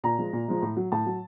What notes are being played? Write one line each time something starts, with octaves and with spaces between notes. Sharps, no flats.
A#2 A#5
F3 G#3
A#2
F3 G#3
A2
F#3
A2 A5
F#3